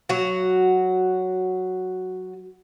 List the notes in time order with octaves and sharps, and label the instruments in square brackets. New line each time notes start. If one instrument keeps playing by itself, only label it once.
[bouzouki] F#3 F#4